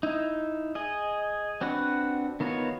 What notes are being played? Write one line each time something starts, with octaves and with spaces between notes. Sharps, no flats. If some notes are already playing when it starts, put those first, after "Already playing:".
D#4 E4
G#4 D#5
C4 D4 F#4 B4 F#5
D#3 B3 F4 F#4 C#5